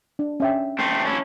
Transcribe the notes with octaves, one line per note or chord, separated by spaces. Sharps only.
D4
C#4 E5 G5
A3 C4
C#4 E4 A5